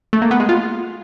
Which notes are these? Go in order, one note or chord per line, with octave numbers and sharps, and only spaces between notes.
A3
A#3
B3
G#3
F4